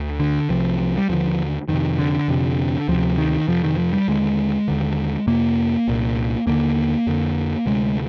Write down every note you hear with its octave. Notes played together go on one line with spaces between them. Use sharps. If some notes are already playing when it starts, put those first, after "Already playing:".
Already playing: D2
D3
C2 C3 F3
F3
G3
D#2 D3 F3
F2 C3 D#3
D3
F2 C3
D2 C3 F3
D#3
F2 C3 F3
D#3
F3
G3
D#2 D3 G#3
D#2 D3
F2 C3 A#3
C2 A#2
D#2 D3 A#3
F2 D3
D2 C3 G#3